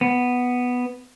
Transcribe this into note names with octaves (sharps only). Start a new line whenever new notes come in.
B3